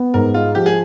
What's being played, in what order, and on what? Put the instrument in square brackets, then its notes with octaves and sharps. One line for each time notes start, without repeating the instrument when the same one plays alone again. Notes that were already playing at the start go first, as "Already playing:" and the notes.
Already playing: [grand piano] B3
[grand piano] G#2 [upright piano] A#4
[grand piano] G#3 [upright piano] F4
[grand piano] F3 [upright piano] G4
[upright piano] G#4